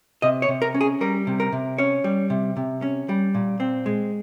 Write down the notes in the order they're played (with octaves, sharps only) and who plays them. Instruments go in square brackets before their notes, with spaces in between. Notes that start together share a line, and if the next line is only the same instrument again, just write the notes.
[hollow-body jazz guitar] C3 D#5
C#5
C3
A#4
C#4
G#4
G3 A#4
C3
A#4
C3
C#4 C#5
G3
C3
C3
C#4
G3
A#2
C4
G#3